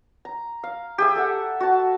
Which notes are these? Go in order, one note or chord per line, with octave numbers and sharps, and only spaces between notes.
A#5
F5
G4 G#4 E5
A4 E5 F#5
F#4 A5